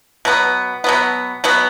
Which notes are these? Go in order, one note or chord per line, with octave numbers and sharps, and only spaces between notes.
B2 F#3 B3
B2 F#3 B3
B2 F#3 B3